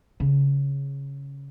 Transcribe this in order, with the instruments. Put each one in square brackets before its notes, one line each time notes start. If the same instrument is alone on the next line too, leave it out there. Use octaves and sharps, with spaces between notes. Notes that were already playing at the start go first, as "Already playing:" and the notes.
[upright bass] C#3